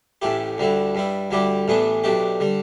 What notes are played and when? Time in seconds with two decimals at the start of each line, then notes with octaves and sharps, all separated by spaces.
0.22 A1 A2 A3 E4 G4
0.58 D2 D3 G3 E4
0.95 G2 G3 E4
1.31 D2 D3 G3 E4 G4
1.68 A1 A2 E3 B3 D4
2.04 B1 B2 A3 D4 G4
2.40 D3 G3